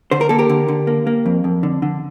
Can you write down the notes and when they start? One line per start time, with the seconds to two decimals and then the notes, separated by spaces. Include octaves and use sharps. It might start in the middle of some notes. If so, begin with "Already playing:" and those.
0.11 D3 C5
0.21 A#4
0.29 A#3 A4
0.39 G4 A#4
0.49 D3
0.69 D3
0.87 A#3
1.07 A#3
1.26 F2
1.44 F2
1.63 D3
1.82 D3